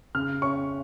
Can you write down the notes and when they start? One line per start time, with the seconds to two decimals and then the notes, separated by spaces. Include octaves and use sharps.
0.15 C#3 F6
0.42 C#4 C#6